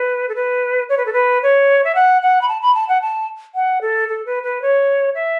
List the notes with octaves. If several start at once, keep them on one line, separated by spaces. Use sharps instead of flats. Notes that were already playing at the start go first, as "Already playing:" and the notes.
Already playing: B4
A4
B4
C#5
B4
A4
B4
C#5
E5
F#5
F#5
B5
A5
B5
A5
F#5
A5
F#5
A4
A4
B4
B4
C#5
E5